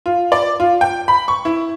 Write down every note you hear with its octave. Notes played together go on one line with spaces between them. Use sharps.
F4
D5
F4
G5
B5
C#6
E4